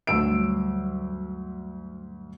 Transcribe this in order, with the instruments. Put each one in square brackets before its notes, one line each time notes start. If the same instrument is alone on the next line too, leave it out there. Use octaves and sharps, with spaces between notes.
[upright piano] D2 E6 D7 [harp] G2 F#3 G3